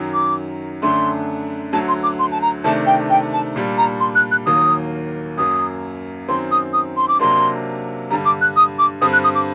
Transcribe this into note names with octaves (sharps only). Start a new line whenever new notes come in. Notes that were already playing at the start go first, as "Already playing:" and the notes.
Already playing: F#2 D#3 F#3
D6
F#2 D3 A3 D4 C6
D2 D3 F#3 A5
C6
D6
C6
A5
A#5
C3 D#3 A3 D4 A5
G5
G5
A5
A#2 G3 D4
A#5
C6
F#6
F#6
D#2 D#3 F#3 A#3 D#6
F#2 F#3 A#3 D#6
F#2 D#3 F#3 C4 C6
D#6
D#6
C6
D6
C3 F#3 A#3 D4 C6
G2 D3 G3 A#5
D6
F#6
D#6
D6
G2 D3 G3 C4 D#6
F#6
D#6
D6